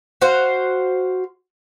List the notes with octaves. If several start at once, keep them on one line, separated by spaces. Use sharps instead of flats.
F#4 C5 F5